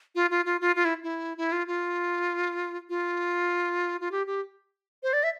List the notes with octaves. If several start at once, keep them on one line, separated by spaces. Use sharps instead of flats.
F4
F4
F4
F4
F4
E4
E4
E4
F4
F4
F4
F4
G4
G4
C5
D5
E5